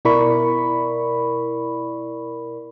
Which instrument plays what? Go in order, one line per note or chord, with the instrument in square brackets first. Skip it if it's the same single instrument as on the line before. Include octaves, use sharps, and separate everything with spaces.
[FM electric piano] B2 E4 A#4 D5 B5 C#6